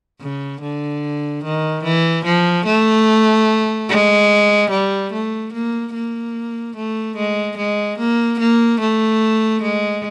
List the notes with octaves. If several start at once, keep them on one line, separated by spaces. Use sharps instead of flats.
C#3
D3
D#3
E3
F3
A3
G#3
G3
A3
A#3
A#3
A3
G#3
G#3
A#3
A#3
A3
G#3